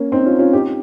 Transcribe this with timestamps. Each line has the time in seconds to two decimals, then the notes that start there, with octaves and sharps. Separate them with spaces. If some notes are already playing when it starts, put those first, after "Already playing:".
Already playing: A#3 C#4
0.12 C4 D#4
0.26 C#4 F4
0.39 C#4 F4
0.53 D#4 G4